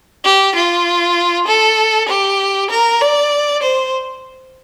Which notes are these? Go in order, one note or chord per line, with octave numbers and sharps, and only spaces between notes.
G4
F4
A4
G4
A#4
D5
C5